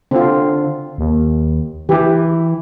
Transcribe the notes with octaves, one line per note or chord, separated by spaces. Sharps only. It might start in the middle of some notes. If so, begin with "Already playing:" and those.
D3 C4 F4
D#2
E3 E4 G4